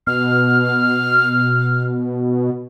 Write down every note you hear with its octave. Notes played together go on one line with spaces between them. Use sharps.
B2 F6